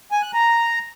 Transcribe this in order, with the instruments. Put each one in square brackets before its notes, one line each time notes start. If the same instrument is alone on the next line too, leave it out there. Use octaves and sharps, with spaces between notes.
[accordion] G#5
F#6
A#5